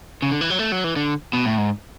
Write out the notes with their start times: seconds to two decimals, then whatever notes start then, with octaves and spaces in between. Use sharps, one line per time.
0.22 C#3
0.31 D3
0.41 E3
0.50 F#3
0.59 A3
0.72 F#3
0.84 E3
0.96 D3
1.33 B2
1.45 A2
1.58 G#2